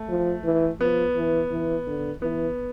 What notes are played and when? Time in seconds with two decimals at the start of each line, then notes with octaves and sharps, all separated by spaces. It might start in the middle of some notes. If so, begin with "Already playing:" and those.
Already playing: A3
0.09 F3
0.44 E3
0.80 F3 B3
1.16 E3
1.51 E3
1.87 D3
2.22 E3 B3